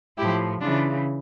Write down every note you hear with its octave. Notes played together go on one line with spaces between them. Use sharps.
A2 F3 E4 G4
C#3 E3 D4 F4